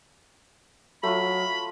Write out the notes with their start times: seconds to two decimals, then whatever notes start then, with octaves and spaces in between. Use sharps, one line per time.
1.03 F#3 A3 F4 B5